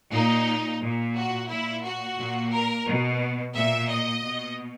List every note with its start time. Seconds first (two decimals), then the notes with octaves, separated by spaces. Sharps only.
0.13 A#2 D#4
0.81 A#2
1.16 F#4
1.49 A#2 E4
1.84 F#4
2.18 A#2
2.52 A#4
2.87 B2
3.55 A#2 E5
3.89 D#5
4.24 B2